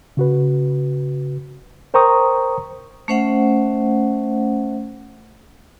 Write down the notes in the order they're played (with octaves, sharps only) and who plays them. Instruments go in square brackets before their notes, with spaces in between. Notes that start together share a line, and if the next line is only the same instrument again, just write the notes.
[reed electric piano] C#3 F#4 B4
A#4 C5 G5 A#5 C#6 D#6
[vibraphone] A3 C#4 C5 E5 F#5